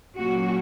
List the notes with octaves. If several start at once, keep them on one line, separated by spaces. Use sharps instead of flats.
A#2 F#3 A#3 C#4 F#4